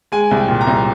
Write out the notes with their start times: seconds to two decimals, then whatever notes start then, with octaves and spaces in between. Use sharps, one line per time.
0.12 G#3 G#5
0.31 C2
0.37 G5
0.48 A#2
0.61 A#5
0.67 C2